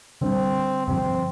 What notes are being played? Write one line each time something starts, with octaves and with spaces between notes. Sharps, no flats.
D3 G3 C4 D4
G2 D3 F3 C4